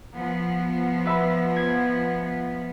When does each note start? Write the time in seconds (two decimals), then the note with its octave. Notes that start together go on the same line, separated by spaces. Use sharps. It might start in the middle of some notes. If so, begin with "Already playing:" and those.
0.14 F3 B3
1.05 B4 E5 B5
1.56 G#6 D7